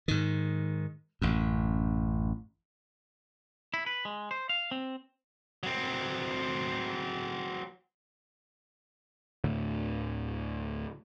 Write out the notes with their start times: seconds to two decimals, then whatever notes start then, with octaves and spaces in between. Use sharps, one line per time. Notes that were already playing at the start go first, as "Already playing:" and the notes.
0.08 G#2 D#3
1.22 A1 F#2
3.74 E4
3.86 B4
4.05 G#3
4.31 C5
4.49 F5
4.71 C4
5.63 F#3 C4
9.44 D2 A2 D3